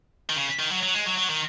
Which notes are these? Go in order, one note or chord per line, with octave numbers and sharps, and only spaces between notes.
D#3
C#3
D#3
F#3
F#3
G#3
F#3
F#3
D#3